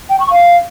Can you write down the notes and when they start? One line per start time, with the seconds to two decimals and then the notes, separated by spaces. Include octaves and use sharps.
0.10 G5
0.20 C#6
0.31 F5